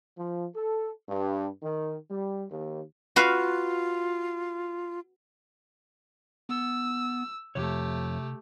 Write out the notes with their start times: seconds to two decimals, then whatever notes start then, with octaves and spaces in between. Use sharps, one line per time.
0.17 F3
0.56 A4
1.09 G2
1.62 D#3
2.10 G3
2.51 D#2
3.16 F4 F#4 B4 F5
6.49 B3 E6
7.55 F2 C3 A3 G4 C#5